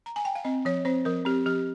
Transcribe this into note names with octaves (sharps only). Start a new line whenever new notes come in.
A#5
G#5
G5
F5
C4 D#5
F3 C#5
C4 C5
F3 A#4
C4 G4
F3 G4